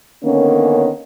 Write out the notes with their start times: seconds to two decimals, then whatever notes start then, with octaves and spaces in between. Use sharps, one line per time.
0.24 D3 D#3 A#3 B3 C#4